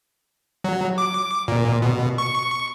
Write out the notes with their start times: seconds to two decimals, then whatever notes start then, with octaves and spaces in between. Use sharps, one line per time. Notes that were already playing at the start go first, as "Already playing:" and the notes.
0.64 F#3
0.98 D6
1.48 A#2
1.82 B2
2.18 C#6